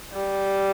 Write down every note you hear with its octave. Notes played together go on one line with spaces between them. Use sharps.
G3